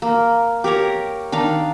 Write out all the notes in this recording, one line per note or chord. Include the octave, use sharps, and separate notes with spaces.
A#3
G4 A#4 C#5 A#5
D#3 D4 F5